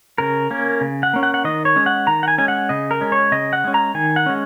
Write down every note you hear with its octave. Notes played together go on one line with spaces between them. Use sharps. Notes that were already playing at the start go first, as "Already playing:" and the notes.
C#3 A#4
A#3 C#4
C#3
F#5
A#3 C#4
F#5
F#5
D#3 D#5
C#5
G#3 C#4
F#5
D#3 A#5
F#5
G#5
G#3 C#4 G#5
F#5
C#3 D#5
A#4
G#3 C#4
C#5
C#3 D#5
F#5
G#3 C#4
A#5
D#3 G#5
F#5
G#3 C#4